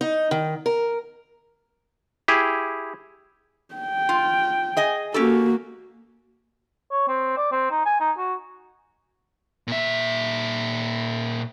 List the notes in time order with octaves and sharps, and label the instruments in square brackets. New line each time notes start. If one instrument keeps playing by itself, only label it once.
[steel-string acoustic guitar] D#4
D#3
A#4
[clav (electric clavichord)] E4 G4 G#4
[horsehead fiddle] G5
[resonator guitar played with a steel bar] F4
G#4 D#5 G#5
[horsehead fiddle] A#3 F#4 [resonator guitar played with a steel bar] C#4 G4 A4
[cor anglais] C#5
C4
D5
C4
D#4
G#5
D#4
F#4
[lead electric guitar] A#2 E5